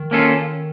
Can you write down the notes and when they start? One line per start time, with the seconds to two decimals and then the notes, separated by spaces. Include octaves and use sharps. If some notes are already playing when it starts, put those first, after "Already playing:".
Already playing: D#3
0.11 A#3 C#4 F4 A4